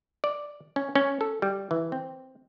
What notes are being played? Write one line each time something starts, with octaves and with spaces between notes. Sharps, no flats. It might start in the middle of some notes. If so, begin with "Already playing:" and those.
D5
C#4
C#4
A4
G3
E3
C4